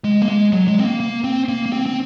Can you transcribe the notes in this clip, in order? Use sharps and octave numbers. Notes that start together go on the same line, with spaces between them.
G#3
A#3
G#3
F#3
G#3
C4
A#3
A#3
C4
A#3
A#3
C4
C4